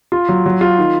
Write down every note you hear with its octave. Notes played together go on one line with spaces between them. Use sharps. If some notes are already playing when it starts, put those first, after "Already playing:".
F4
F#3
F#3
F4
D#3